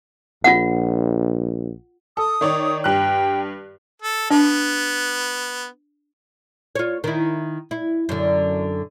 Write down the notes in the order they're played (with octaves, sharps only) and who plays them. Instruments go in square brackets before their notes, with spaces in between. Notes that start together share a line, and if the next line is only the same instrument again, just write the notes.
[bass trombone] A#1 [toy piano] F4 F#5
[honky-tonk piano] A4 [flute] D#6
[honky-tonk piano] D#3 C#5 D5
[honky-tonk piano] G2 F#6 [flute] G5
[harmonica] A4
[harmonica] B3 [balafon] D4
[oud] F4 C#5
D#3 E4
E4
F#2 D3